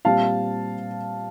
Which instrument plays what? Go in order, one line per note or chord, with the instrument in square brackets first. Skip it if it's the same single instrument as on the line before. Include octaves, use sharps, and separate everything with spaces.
[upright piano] A#2 G3 C4 F5 A5